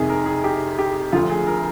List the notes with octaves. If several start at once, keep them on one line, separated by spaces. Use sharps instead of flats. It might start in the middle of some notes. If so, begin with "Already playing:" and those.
Already playing: F2 C3 D#3 G#4
A#4
G#4
G4
G4
D2 D3 F3 F4
G#4
A#4